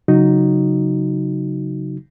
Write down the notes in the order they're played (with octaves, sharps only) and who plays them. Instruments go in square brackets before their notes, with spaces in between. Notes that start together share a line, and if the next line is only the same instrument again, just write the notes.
[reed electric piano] C#3 F#3 D#4 F#4